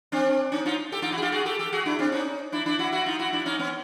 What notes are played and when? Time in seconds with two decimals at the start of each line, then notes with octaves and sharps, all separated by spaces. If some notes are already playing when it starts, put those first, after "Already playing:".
0.12 C4 D4
0.52 C#4 D#4
0.66 D#4 F4
0.92 G4 A4
1.02 D#4 F4
1.12 E4 F#4
1.18 G#4
1.22 F4 G4
1.32 F#4 G#4
1.45 G4 A4
1.59 G4 A4
1.72 F#4 G#4
1.86 D4 E4
1.99 C4 D4
2.12 C#4 D#4
2.52 D4 E4
2.66 D4 E4
2.79 E4 F#4
2.92 E4 F#4
3.06 D#4 F4
3.19 E4 F#4
3.33 D4 E4
3.46 C#4 D#4
3.59 B3 C#4